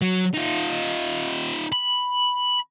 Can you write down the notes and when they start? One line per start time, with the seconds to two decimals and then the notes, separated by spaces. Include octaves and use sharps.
0.02 F#3
0.34 D#4 F4
1.72 B5